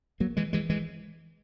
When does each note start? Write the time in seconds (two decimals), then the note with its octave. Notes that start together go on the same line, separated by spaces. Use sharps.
0.20 F#3 A#3
0.37 E3 G#3
0.53 E3 G#3
0.70 E3 G#3